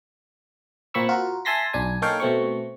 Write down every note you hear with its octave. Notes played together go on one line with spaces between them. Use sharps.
A#2 A#3 C4 B5 C#6 E6
F4 F#4 A#4
E5 G#5 A5 C6 A#6 B6
B1 D4 G#5
A#3 D#4 A4 C#5 F5 G5
B2 A3 C4 C#6